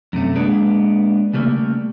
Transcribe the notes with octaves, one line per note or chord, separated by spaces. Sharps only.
F#2 C3 A3 C#4
G#3 A#3 B3 D4 G#4 B4
C#3 G3 A3 A#3